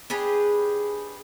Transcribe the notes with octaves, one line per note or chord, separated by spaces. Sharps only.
D4 G4 G#4 B4